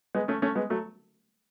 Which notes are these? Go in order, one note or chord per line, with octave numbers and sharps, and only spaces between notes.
G#3 B3
A3 C#4
A3 C#4
G#3 B3
F#3 A3